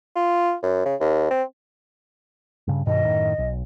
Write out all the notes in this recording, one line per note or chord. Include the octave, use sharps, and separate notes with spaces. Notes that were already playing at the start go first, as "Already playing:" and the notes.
F4
F#2
C#3
D#2
C4
G2 C#3
G2 B2 D#3 D#5
F#2 A2 D#3
B1